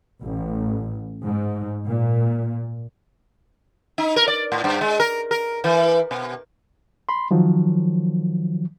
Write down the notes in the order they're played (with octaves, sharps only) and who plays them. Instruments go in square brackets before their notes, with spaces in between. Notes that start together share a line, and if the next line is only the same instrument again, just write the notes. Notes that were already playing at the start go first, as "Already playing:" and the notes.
[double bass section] A1
G#2
A#2
[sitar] D#4
A#4
D5
A2
G2
G#3
A#4
A#4
E3
B2
[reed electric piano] B5 C6
D#3 F3 F#3